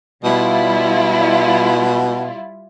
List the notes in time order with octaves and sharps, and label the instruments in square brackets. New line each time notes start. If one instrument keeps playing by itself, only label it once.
[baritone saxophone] B2 [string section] G3 E4 F4